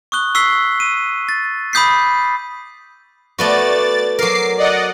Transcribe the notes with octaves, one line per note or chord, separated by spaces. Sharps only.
C#6 D#6 F#6 G7
C#6 E6 B6 C7 G7
D#7
A6
B5 D6 D#6 G6 B6 C7
A3 B3 F#4 D5 A6
F#3 A#4 D6 C7
D5 D#5 F#5